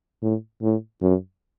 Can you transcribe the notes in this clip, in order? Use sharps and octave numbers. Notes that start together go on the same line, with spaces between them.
A2
A2
F#2